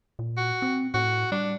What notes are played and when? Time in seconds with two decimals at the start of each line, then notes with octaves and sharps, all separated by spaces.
0.19 A#2
0.37 F#4
0.62 C4
0.94 A2 F#4
1.32 G3 D4